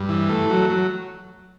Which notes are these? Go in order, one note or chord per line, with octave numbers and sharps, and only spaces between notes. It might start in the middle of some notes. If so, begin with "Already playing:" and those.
Already playing: G2
E3
A3
F#3
F#3